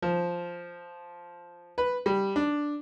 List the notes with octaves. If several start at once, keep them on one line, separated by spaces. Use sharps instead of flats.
F3
B4
G3
D4